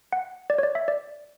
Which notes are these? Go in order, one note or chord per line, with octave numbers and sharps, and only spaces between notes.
F#5
D5
C#5
D5
E5
D5